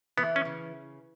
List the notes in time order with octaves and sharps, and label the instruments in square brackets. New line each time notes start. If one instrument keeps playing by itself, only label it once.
[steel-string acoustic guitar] E3 [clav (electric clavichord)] B3
[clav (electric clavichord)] C#4
[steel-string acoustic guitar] C#3